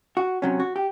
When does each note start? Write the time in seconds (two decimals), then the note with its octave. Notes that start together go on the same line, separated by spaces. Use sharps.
0.17 F#4
0.42 C3 F#3 C#4
0.60 F#4
0.76 G4